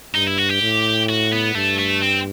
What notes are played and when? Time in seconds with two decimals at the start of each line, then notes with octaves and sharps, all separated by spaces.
0.15 G2 D#4
0.27 E4
0.38 F#4
0.50 G4
0.62 A2
1.09 F#4
1.32 B3
1.55 G2 A3
1.78 A3
2.02 C4